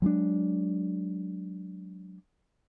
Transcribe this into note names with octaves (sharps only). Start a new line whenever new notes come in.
F#3 G#3 C#4 D4